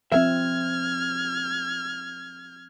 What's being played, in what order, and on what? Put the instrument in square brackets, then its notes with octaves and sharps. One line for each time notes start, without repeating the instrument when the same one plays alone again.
[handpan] F3 C4 [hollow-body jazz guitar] E5 [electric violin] F6 G#6